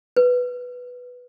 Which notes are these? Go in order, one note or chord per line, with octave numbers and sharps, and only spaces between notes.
B4